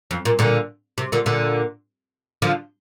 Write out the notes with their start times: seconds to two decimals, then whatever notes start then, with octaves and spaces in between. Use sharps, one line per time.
0.11 F2
0.25 A#2
0.39 A#2 D3
0.98 C3
1.12 A#2 D3
1.26 A#2 D3
2.42 D3 F3